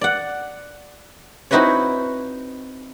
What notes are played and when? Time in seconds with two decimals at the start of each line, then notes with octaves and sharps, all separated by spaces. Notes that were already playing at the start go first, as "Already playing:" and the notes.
0.01 D5 F#5
1.51 C4 D#4 E4 F#4 B4 C#5